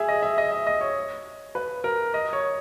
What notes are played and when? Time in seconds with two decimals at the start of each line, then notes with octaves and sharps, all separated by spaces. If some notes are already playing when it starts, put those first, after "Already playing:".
Already playing: G#4 E5
0.08 D#5
0.23 E5
0.38 D#5
0.52 E5
0.67 D#5
0.81 C#5
1.55 B4
1.84 A#4
2.14 D#5
2.33 C#5